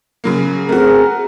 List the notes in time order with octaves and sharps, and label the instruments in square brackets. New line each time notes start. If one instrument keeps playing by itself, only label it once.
[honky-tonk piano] C#3 F#3 A#3
[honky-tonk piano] A3 F#4 [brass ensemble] C4 G#4 A#4